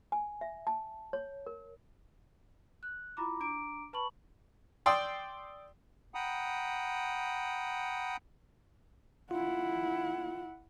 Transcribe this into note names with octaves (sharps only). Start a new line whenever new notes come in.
G#5
E5
A5
C#5
A#4
F#6
E4 F4 A#5 B5 D6
D4 A#5 D6 D7
B4 A5 B5 C#6 F#7
D5 G5 C6 D#6 E6
F#5 G5 A#5 B5 D#6
E4 F4 F#5